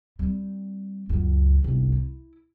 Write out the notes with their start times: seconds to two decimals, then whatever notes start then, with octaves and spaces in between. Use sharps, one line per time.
0.19 G3 C4
1.09 C#2 F#2
1.62 G1 C2
1.92 E4